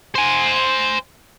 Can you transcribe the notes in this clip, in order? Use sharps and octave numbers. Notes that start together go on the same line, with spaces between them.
C5 G#5